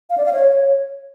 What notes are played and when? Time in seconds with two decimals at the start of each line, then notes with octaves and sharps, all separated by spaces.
0.10 F5
0.18 D5
0.25 F5
0.33 C#5